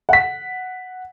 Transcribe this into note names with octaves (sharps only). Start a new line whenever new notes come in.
F#5 B6